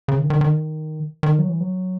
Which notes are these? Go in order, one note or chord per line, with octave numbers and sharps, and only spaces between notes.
C#3
D#3
D#3
D#3
D#3
F#3
E3
F#3